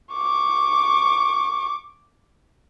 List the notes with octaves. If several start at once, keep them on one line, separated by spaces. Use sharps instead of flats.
C#6 D6